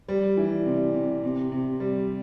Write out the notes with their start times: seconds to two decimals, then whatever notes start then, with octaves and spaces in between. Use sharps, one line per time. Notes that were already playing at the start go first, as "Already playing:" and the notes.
0.08 G3
0.37 E3
0.65 C3
0.94 C3
1.24 C3
1.52 C3
1.80 G3